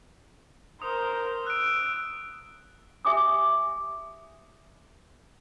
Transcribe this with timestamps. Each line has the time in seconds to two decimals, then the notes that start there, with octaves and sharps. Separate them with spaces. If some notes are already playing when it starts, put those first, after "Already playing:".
0.82 A#4 C5 D#6
1.47 E6 F#6 D7
3.05 G4 E5 G#5 D6 D#6